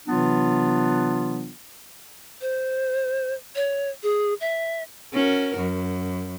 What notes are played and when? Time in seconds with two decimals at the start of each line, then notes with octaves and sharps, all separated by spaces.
0.07 C3 E3 F#3 B3 D4 F4
2.41 C5
3.55 C#5
4.03 G#4
4.41 E5
5.13 C#4 F#4 A#4
5.57 F#2